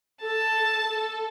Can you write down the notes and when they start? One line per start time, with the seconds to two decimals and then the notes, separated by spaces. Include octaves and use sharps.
0.22 A4 A5
0.86 A4